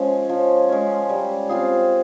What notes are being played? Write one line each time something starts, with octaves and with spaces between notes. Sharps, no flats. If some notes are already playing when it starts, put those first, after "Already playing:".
Already playing: F3 G#3 C#4
F3
G#3 C#4
G3
C4 F4 G#4